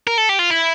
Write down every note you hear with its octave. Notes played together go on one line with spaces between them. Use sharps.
A#4
A4
G4
F4
E4